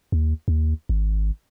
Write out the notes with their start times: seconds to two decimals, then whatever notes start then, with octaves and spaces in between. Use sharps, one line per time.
0.12 D#2
0.48 D#2
0.89 G#1